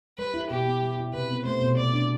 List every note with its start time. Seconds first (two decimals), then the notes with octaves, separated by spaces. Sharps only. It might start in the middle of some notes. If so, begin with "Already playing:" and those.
0.18 G3 B4
0.34 E4
0.50 B2 G4
0.66 B3
0.82 G3
0.98 E4
1.13 C3 B4
1.30 B3
1.45 A3 C5
1.61 B2
1.77 B2 D5
1.93 D4